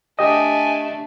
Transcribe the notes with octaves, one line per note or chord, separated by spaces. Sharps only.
A3 D4 G4 D#5 G#5